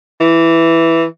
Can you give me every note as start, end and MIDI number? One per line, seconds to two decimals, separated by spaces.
0.21 1.04 52